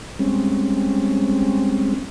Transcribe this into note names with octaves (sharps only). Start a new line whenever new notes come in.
G3 G#3 C4 C#4